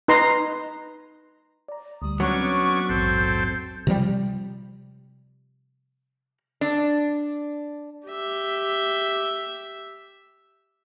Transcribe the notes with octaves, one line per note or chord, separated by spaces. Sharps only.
D#4 B4 A#5 C6
D5 A#5
D2 G3 D#6
F#3 B3 C#4 D4 C#6
C4
A#1 E2 G#2 C4 A4 G6
C3 F3 G3
D4
G4 E5